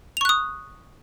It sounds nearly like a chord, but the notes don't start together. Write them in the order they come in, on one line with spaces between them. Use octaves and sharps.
F7 C#6 F#6 D#6